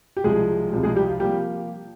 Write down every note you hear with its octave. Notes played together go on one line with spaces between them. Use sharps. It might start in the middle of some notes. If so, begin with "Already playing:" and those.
G4
C2 C3 F3 G#3 G#4
C2 C3 F3 G#3
G#3 G#4
G3 G4
F4
F3 G3 A#3 G4